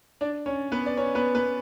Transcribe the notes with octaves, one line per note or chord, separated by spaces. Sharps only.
D4 D5
C#4 C#5
B3 B4
D5
C#4 C#5
B3 B4
B3 B4